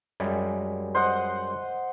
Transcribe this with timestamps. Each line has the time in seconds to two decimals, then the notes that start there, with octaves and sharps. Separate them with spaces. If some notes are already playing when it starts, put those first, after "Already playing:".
0.20 F#2 G3 G#3
0.95 C5 D#5 F#5